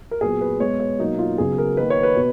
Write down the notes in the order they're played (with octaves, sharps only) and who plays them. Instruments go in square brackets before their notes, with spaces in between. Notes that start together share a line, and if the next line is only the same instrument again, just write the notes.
[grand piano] A#4
A#2 F#3 B3 G#4
B4
B2 G#3 B3 C#5
C#5
B2 F#3 A#3 D#4
F4
C#3 F#3 B3 G#4
A#4
D#3 A#3 B4
C#5
B4
B2